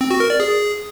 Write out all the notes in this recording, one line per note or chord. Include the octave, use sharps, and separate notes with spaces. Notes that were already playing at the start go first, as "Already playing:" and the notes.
C4
F#4
A#4
D5
G#4